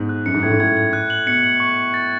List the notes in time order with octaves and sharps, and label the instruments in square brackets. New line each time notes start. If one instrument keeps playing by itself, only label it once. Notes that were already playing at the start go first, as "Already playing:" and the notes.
Already playing: [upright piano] G#2 B2
[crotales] F#6
[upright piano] F#2 [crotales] C#7
[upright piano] G#2
[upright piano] A2 [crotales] G#6
[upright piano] G#2
[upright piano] A2 [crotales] G#6
[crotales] G#6
F#6
F#7
[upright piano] B2 [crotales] C#7
[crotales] F#7
C#6
C#6
A6